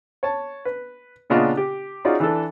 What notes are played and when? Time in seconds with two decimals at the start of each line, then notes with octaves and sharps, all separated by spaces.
0.23 C#5 A5
0.65 B4
1.30 A#2 C#3 B3 D4 F4 D#5
1.57 G4
2.05 C#4 D#4 F4 F#4 G#4 D5
2.20 E3 D4 A4